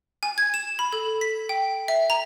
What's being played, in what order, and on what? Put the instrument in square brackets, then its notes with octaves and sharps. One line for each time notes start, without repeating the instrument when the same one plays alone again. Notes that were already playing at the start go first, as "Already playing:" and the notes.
[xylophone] G#5
G#6
E7
B5
A4
B6
G5
E5
A#5